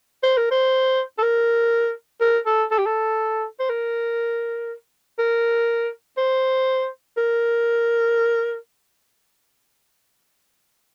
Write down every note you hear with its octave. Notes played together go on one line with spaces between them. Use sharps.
C5
A#4
C5
A4
A#4
A#4
A4
A4
G4
A4
C5
A#4
A#4
C5
A#4